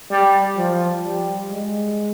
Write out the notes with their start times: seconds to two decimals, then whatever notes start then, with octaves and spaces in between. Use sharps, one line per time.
0.10 G3
0.57 F3
1.03 G3
1.51 G#3